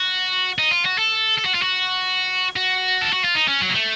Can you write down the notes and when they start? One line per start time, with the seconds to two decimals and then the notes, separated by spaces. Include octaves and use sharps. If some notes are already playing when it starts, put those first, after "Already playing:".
Already playing: F#4
0.58 D#4
0.71 F4
0.85 F#4
0.98 A4
1.38 A4
1.45 F#4
1.54 F4
1.62 F#4
2.56 F#4
3.01 A4
3.13 F#4
3.24 F4
3.35 D#4
3.48 C#4
3.61 F#3
3.69 A#3
3.74 A3